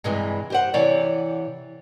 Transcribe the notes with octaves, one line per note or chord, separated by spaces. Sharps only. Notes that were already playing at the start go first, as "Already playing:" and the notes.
G2 C3 E3 G#3
G4 C5 F#5
C3 E3 C#5 D5